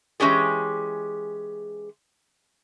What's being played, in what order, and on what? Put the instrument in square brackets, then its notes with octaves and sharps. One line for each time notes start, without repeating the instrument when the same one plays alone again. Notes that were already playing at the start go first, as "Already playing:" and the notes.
[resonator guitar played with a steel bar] E3 G#3 C#4 G4 G#4